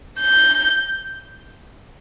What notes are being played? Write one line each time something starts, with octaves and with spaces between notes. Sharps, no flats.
G6